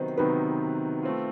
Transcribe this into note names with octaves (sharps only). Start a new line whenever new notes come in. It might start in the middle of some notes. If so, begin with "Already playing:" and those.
Already playing: C3 D#3 F#3 B3 D#4 C5
C3 D#3 F#3 B3 D#4 B4
A3 C4 F4